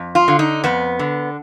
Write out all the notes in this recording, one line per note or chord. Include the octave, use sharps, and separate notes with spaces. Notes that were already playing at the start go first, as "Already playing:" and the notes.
Already playing: F2
F4
D3
D#4
F2 B3
D3